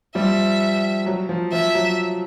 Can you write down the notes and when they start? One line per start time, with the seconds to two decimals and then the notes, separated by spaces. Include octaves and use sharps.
0.15 F3 G3 E5
1.06 F#3
1.29 F3
1.53 F3 E5
1.75 F#3